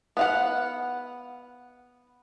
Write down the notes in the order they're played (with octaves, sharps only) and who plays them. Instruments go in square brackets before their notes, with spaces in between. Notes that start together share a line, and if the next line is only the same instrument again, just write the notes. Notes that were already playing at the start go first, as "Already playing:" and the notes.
[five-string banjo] B3 F5 F#5